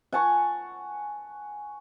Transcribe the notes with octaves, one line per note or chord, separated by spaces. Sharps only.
F#5 G#5 A5 C#6